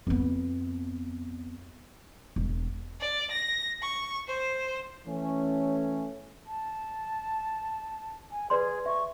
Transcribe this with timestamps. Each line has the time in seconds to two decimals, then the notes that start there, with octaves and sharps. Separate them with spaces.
0.07 F2 B3
2.36 E1
3.00 D5
3.32 A#6
3.82 C#6
4.28 C5
5.07 E3 A3 C#4
6.47 A5
8.31 G#5
8.50 G#4 B4 D5 C6
8.86 E5 C#6